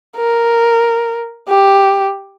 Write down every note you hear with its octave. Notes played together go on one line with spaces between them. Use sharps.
A#4
G4